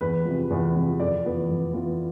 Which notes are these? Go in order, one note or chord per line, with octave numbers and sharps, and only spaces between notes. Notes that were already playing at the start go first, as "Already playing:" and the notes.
E2 B4
C3 F3
E2
C3 F3
F2 D5
E3 B3 F4
F2
E3 B3 F4